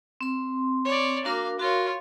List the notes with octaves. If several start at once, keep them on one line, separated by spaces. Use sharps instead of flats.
C4 C6
C#5 D5
A#3 D4 F#4 A#4 F5
F4 F#4 A#4 C#5